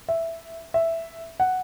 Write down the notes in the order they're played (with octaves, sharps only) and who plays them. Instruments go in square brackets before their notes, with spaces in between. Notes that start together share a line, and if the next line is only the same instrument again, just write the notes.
[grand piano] E5
E5
F#5